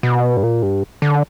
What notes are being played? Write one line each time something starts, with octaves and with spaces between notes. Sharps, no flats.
B2
G2
A#2
G2
D3